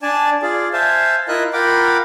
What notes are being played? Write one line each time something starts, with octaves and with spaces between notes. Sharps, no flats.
D4 D5 G#5 A5
F4 G#4 D5
C5 E5 F5 G#5 A5
E4 F4 A#4 D#5 E5 F#6
F4 A#4 F#5 G5 B5 D6